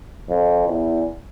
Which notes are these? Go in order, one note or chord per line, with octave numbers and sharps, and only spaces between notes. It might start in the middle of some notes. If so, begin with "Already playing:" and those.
F2
E2